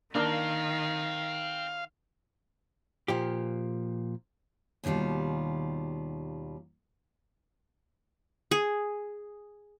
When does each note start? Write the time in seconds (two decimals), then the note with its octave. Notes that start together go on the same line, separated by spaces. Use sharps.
0.15 D#3 A#3 C4 D4 A#4 F5
3.08 A#2 F3 G4
4.84 D#2 B2 D#3 G3 F4
8.51 G#4